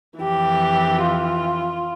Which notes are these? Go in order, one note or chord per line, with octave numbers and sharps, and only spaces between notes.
F2 E3 G4
F4